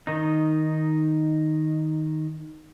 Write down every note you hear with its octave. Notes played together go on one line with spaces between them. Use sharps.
D#3 D#4